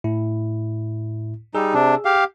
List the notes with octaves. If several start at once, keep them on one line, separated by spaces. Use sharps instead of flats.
A2 E4
G3 D#4 G#4 E6
C3 D4
G4 F5